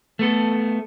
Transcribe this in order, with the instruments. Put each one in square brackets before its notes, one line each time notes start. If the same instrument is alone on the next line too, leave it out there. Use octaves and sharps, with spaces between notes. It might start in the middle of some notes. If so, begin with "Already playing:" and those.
[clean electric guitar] A3 B3 A4